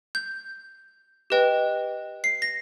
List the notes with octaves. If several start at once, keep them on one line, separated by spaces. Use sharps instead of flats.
G6
G4 B4 D#5 G5
C7
A#6